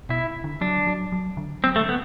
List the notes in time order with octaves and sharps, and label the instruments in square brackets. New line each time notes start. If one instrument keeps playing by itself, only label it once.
[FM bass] B2 [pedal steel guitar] E4
[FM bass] D3
[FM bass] F#3 [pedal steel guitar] D4
[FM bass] F#3
F#3
D3
[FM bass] F#3 [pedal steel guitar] C4
[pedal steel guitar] A3
[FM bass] D3
[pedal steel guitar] B3